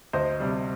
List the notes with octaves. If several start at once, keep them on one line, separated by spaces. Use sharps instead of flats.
D2 C5 D#5
C3 G3